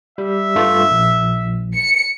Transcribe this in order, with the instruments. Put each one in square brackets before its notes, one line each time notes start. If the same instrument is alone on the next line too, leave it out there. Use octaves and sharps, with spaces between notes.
[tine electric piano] G3 [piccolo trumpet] E5
[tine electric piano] G2 A3 F4
A#1
[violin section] C#7